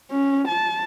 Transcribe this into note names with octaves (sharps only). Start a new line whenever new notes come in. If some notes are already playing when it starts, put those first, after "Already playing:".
C#4
A5